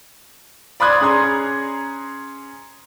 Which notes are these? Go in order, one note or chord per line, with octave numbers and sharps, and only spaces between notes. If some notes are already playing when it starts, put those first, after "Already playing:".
D5 B5 C6 D#6 F#6 G#6
C#4 G#4 A#5 C6